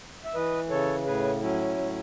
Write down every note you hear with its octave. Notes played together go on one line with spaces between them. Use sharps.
E5
E3 B4 D#5
C#3 A4 C#5
A2 G#4 B4
F#3 C#4 E4
A2